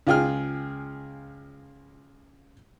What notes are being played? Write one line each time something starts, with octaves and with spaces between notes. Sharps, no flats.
C#2 F4 G#4 G5 F6